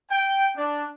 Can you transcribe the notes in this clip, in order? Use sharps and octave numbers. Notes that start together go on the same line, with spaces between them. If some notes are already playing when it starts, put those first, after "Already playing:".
G5
D4